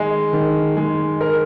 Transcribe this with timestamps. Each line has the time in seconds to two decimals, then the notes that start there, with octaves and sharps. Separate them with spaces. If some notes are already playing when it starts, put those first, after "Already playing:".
Already playing: D#3 G#3
0.33 D#3
0.77 G#3
1.21 A#4